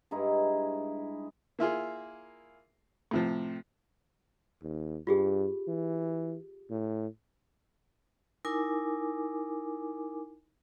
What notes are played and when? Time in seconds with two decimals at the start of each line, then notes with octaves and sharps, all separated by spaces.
0.11 G2 G#3 D#4 E4
1.59 A#3 E4 F4 G#4
3.11 A2 C3 F3
4.62 D#2
5.07 G2 F4 G4 G#4
5.68 E3
6.70 A2
8.45 D#4 E4 A#4 G#5 D6